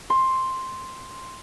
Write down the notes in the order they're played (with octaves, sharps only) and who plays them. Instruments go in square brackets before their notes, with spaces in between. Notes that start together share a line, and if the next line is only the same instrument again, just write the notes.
[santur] C6